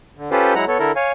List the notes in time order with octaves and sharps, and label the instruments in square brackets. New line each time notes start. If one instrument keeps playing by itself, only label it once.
[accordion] D3
C#4 F4 G4 A4 B4 C5
F#3 G#3 E4 F#5 A#5
B3 A4 C#5
D3 E4 A4 A#4
C#5 F5 G#5